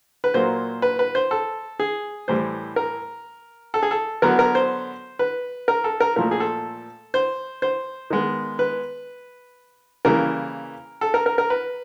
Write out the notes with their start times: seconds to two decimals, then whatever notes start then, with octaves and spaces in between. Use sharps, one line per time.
0.24 B4
0.34 A#2 F#3 A#3 C5
0.82 B4
0.99 B4
1.15 C5
1.31 A4
1.80 G#4
2.28 A2 E3 G3 C5
2.76 A#4
3.74 A4
3.83 G#4
3.91 A4
4.22 D3 F#3 B3 A#4
4.39 A#4
4.55 C5
5.19 B4
5.68 A#4
5.84 A4
6.00 A#4
6.16 A#2 F3 A3 A#4
6.31 G#4
6.40 A4
7.14 C5
7.62 C5
8.10 D#3 G#3 B3
8.59 B4
10.05 C#3 E3 G3 A#3 A#4
11.01 A4
11.14 A#4
11.26 A#4
11.38 A#4
11.50 B4